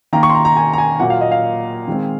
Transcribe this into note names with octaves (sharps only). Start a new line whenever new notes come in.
D#3 A#3 A#5
C#6
C6
A#5
A#5
G#5
A#5
G#5
A#2 F#3 A#3 F#5
F5
D#5
F5
D#3 G#3 C4